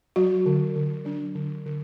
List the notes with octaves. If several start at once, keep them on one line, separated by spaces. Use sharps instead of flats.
F#3 F#4
D3
D3
F#3 D4
D3
D3